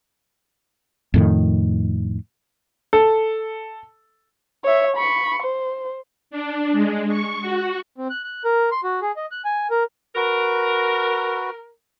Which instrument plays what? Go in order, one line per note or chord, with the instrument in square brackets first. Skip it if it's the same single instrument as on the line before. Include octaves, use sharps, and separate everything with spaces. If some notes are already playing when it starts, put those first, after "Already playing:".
[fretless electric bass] F2 A2 D#3
[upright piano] A4
[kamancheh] C#5 E5
B5 C#6
C5
[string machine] D4
G#3
C#6
F#4
[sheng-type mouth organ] C4
F#6
F#6
A#4
C6
F#4
G#4
D#5
F#6
G#5
A#4
[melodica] F#4 B4 [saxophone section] A#4